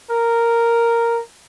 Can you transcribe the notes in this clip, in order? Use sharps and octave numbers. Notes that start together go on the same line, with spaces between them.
A#4